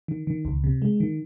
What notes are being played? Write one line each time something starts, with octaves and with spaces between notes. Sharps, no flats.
D#3
D#3
C#2
C3
G#3
D#3